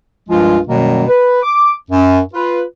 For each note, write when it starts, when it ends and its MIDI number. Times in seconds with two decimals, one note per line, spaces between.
0.29 0.59 36
0.29 0.59 43
0.29 0.59 53
0.29 0.59 56
0.29 0.59 65
0.67 1.03 42
0.67 1.03 47
0.67 1.03 51
0.67 1.03 54
0.67 1.03 55
0.67 1.03 58
1.07 1.39 71
1.43 1.72 86
1.91 2.20 42
2.34 2.62 65
2.34 2.62 71